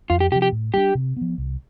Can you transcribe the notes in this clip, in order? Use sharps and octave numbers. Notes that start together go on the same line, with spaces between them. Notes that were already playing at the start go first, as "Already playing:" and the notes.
F2 F4
G4
C3 F3 G4
G4
A2
G3 B3 D4 G4
C3
F3 B3
C2